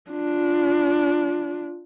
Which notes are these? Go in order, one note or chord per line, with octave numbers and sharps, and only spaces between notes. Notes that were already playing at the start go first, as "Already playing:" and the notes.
D4 F4